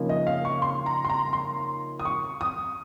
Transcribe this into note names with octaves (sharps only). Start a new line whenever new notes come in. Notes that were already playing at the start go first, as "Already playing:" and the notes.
Already playing: C#3 F3 A#3 D#4
D#5
F5
C#6
C6
A#5
C6
A#5
C6
D#6
C#6
D#6